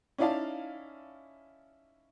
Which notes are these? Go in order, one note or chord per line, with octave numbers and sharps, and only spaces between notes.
C#4 D#4 E4 D5 F5 A5